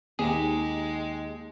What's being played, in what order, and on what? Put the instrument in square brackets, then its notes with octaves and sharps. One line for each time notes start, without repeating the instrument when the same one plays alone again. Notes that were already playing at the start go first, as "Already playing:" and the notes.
[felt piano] D#2 [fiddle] G#3 [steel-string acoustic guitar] D#4 G4 [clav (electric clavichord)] G#4